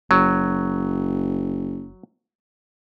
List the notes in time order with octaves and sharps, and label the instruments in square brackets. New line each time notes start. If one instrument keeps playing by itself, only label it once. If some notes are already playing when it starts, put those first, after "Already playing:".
[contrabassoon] F#1 [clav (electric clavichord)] F#3